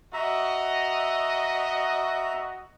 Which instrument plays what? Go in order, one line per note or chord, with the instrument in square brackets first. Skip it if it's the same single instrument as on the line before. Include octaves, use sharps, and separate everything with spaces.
[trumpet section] F#4 D#5 [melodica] E5 A#5